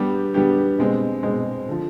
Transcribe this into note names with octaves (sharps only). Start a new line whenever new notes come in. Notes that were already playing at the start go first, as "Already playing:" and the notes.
Already playing: G3 B3 D4 G4
G3 B3 D4 G4
B2 G#3 C4
B2 G#3 C4
D3 F3